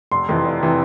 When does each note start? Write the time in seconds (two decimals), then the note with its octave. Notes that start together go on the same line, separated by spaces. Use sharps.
0.12 F1 C6
0.29 F2 C3 E3
0.45 F1
0.62 C3 E3